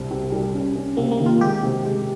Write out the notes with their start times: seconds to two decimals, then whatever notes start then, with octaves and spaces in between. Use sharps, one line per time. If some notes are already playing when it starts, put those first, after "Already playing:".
Already playing: C2 G2 C3
0.11 C3
0.32 G3
0.54 C#4
0.76 C#4
0.97 C3 A#3
1.11 A#3
1.19 D#3
1.26 F4
1.41 G#3 G4
1.63 C3
1.85 G#3